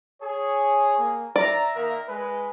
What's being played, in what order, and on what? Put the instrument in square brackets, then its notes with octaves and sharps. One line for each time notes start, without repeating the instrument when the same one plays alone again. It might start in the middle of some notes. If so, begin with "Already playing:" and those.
[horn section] G#4 [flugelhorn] C#5
[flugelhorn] A#3
[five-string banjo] D5 [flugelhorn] E5 [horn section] A#5
[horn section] D#3 A#3 A#4
[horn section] G#3 [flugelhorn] B4